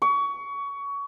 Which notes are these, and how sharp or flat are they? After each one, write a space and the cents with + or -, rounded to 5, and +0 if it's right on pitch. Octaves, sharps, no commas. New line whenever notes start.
C#6 +25